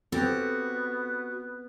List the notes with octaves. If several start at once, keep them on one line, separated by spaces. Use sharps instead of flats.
B3 C4 F#4 G4 A4